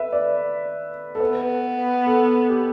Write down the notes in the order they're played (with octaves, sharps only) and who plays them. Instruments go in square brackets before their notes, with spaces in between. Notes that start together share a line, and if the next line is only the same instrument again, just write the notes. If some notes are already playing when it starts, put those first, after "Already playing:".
Already playing: [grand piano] B4 E5
D5
A4
[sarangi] B3 [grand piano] B4
[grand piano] A4
G4